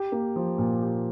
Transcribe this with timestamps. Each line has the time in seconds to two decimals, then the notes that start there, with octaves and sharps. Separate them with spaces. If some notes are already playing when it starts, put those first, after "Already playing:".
Already playing: G4
0.12 A#3
0.36 F3
0.58 A#2
0.82 G4